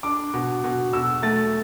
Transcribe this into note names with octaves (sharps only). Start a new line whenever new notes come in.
D4 D6
B2
B2
B2 E6
A3 A6